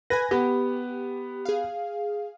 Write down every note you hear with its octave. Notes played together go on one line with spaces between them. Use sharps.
B4 G#5 G#6 A#6
B3 G4
G#4 F5